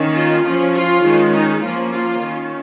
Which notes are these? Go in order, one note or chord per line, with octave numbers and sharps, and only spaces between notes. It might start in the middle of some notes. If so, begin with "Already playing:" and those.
Already playing: D#3 A#3 C#4
F4
F3 C#4
F4
D#3 G#3 C#4
D#4
F3 A#3 C#4 F4
F4
D#3 C#4